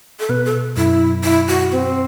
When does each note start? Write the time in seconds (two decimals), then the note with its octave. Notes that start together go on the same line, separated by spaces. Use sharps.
0.20 A4
0.29 B2 B4
0.45 A4
0.76 F#2 E4
1.24 E4
1.48 F#4
1.72 C4